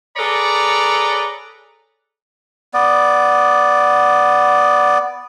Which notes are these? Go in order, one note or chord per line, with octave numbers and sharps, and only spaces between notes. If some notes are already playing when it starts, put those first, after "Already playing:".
G#4 A4 B4 C#5 D5 A#5
B3 D5